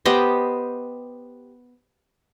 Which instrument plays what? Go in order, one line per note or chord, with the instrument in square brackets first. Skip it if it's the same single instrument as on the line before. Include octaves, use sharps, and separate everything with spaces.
[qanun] B3 G4 C5 D#5